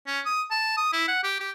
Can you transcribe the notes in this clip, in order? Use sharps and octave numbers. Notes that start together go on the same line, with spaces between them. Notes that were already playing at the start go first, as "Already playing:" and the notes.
C#4
D#6
A5
D#6
E4
F#5
G4
G4